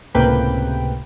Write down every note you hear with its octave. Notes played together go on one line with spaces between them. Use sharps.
C#2 A2 C3 A#3 B4 G5